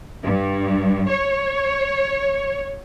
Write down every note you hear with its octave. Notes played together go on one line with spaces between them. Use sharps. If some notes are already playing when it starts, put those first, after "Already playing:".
G2
C#5